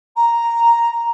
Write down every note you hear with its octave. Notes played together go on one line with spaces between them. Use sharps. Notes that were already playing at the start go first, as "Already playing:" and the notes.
A#5